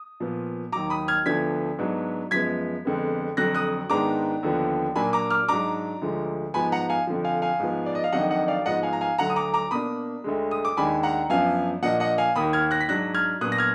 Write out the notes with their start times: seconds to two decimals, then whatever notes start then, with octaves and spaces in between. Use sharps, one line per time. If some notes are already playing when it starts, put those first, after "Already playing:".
Already playing: D#6
0.20 A#2 F3 B3
0.72 D#2 D#3 F#3 A#5 D6
0.90 B5 D#6
1.08 F6 G#6
1.26 D2 D3 F3 B3 D4 G#6 B6
1.78 G#2 F#3 B3 D4
2.31 F#2 F3 G#3 B3 G#6 B6
2.85 F2 D3 G#3 B3
3.37 F2 D3 F#3 F#6 A#6
3.55 D#6 F#6
3.90 G#2 D#3 G#3 B3 D4 A#5 D6
4.43 D#2 D3 F3 B3 D4
4.95 A#2 F#3 A#3 D4 G#5 B5
5.13 A#5 D6
5.30 D6 F6
5.48 G#2 F#3 D4 A#5 D6
6.02 D2 D3 F3 G#3
6.54 G#2 F3 B3 G#5 B5
6.72 F#5 A#5
6.89 F5 G#5
7.07 F2 D3 F3
7.24 F5 G#5
7.42 F5 G#5
7.60 G#2 F3 B3
7.86 D5
7.95 D#5
8.04 F5
8.12 F2 D#3 F#3 D4 D#5 F#5
8.30 D#5 F#5
8.48 D5 F5
8.66 G#2 F3 B3 D#5 F#5
8.83 F5 G#5
8.93 A#5
9.01 F5 G#5
9.18 D2 D3 F#3 F#5 A#5
9.30 D#6
9.36 A#5 D6
9.54 A#5 D6
9.71 B2 A#3 D4 B5 D#6
10.24 D2 D3 G#3
10.51 D#6
10.65 D6
10.77 D#2 D#3 G#3 D4 G#5 B5
11.03 F#5 A#5
11.29 F#2 F3 B3 D4 F5 G#5
11.82 A#2 F3 A#3 D4 D#5 F#5
12.00 D#5 F#5
12.18 F5 G#5
12.36 D#2 D#3 A#3 B5 D#6
12.53 F6 G#6
12.71 F#6 A#6
12.81 B6
12.88 G#2 F#3 D4 F#6 A#6
13.14 F6 G#6
13.41 A#2 F#3 B3 D4 D#6 F#6
13.52 A#6
13.58 F6 G#6